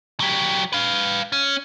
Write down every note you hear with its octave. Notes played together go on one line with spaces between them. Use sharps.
F#3 G4
B4 F5
C#4